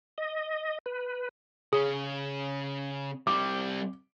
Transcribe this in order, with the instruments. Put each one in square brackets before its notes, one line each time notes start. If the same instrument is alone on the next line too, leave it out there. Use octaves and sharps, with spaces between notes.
[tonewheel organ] D#5
B4
[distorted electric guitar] C#3 C#4 [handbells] G#4
[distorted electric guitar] G3 C4 [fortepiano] D6